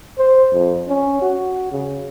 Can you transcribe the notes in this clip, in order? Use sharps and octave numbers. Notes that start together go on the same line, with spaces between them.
C5
F2
C#4
F#4
C#3